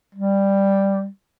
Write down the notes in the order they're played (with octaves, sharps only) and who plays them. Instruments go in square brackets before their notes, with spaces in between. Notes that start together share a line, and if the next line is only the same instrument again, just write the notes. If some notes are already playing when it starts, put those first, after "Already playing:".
[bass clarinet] G3